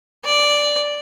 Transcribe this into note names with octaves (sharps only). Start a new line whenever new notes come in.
D5